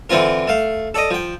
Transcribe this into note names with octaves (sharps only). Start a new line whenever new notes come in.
D3 E3 C4 F4 A#4
A3 F5
A4 D5 D#5
F3 G5